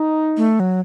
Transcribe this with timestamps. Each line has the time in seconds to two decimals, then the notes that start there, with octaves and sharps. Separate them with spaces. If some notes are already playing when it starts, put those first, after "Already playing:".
Already playing: D#4
0.37 A3
0.60 F#3